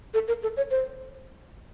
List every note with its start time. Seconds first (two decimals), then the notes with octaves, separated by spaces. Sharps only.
0.14 A4
0.28 A#4
0.43 A4
0.57 C#5
0.71 C5